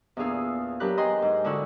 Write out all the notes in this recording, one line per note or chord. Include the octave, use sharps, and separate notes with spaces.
E2 A#2 D4 G#4 F5 E6
F#3 D4 G4 A#4 B4 F#6
D#5 G5 G#5 A#5 C6
G#2
D3 G#3 E4 F#4 C#6 E6